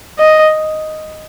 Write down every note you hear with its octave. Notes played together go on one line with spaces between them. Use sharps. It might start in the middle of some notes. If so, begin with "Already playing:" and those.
D#5